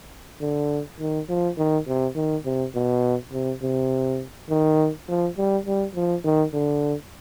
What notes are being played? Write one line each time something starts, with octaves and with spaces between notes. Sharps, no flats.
D3
D#3
F3
D#3
C3
D#3
C3
B2
C3
C3
D#3
F3
G3
G3
F3
D#3
D3